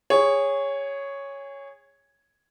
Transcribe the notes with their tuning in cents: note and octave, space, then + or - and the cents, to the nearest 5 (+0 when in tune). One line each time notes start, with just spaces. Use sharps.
G#4 -20 C#5 +0